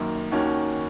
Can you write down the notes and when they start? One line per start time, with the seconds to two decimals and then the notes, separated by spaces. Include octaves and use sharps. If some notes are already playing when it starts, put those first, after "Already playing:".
Already playing: F#2 D#3 A#3
0.32 D#2 D#3 A#3 C#4 F#4